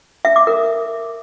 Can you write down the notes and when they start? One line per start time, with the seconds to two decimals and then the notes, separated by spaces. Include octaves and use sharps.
0.25 E5
0.36 D6
0.47 A#4